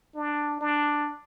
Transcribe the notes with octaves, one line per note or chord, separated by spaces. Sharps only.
D4
D4